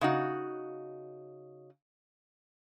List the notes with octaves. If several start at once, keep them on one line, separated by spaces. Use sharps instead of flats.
C#3 D#4 F#4